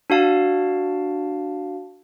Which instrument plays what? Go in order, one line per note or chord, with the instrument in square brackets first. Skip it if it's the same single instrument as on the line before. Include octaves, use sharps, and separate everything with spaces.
[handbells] D4 F#4 F5 A5